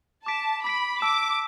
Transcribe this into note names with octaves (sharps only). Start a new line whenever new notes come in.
A5 D6 B6 D7
B5 D6 B6 D7
A5 D6 E6 B6 E7